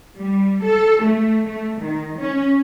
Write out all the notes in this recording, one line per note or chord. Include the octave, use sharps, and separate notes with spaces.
G3
A4
A3
A3
D#3
C#4